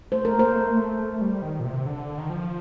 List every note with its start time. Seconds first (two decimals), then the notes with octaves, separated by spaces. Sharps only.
0.12 A3 C5
0.25 A#4
0.33 A#3
0.39 C5
0.56 A3
0.69 A#3
0.76 A3
0.99 A3
1.21 G3
1.42 D#3
1.60 A#2
1.65 C3
1.86 D3
2.18 D#3
2.30 F3